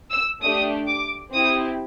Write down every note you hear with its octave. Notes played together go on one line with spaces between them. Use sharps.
E6
A3 D4 G4 D#6
D6
C4 E4 G4 D#6